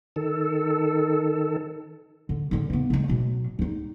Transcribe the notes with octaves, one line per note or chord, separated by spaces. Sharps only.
D#3 A4
D3
D3 G3
C#3 B3
C#3 G#3
B2 F#3
G3 D#4